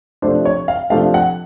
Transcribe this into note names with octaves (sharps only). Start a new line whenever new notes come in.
C3 F3 A3 D4 C5
C#5
F5
C3 F3 A3 D4 F5
F#5